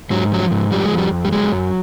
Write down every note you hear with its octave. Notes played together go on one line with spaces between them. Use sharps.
G#2 F#3
F3 F#3
G#2
F3 G3
G#3
F2
G3
F2
G3
F#3 G#3
F#2